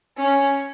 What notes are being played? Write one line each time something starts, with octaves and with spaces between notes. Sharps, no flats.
C#4